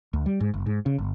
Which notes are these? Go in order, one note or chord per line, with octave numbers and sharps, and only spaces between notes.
D2
G3
G#2
F#1
G#2
C#3
G1